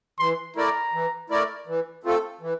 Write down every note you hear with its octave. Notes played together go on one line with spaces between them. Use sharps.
E3 C6
A3 E4 A#4 D5 A#5
E3
A3 E4 A#4 D5
E3
A3 C4 F4 A4
E3